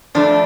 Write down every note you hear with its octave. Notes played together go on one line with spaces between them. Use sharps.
F2 F3 A3 D4